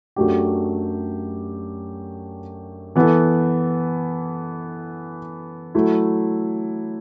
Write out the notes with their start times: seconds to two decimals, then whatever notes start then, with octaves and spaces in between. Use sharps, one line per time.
0.16 F#2 F#3 A3 D4 G4
2.96 E3 B3 E4 A4
5.75 F#3 A3 E4